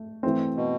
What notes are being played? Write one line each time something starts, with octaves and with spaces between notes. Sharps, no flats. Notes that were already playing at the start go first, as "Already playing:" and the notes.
Already playing: A3
E3 A3 C4
B2